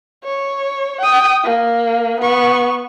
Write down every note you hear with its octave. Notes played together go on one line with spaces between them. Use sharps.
C#5
G5 D#6
A#3
B3 C#6